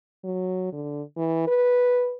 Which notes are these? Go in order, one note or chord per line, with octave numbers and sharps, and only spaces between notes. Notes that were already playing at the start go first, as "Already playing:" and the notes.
F#3
D3
E3
B4